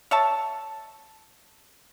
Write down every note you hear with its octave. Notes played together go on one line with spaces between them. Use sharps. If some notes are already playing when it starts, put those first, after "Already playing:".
C#5 E5 A5